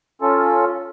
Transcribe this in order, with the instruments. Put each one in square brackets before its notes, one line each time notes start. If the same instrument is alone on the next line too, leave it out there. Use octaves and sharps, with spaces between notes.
[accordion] C#4 F4 A4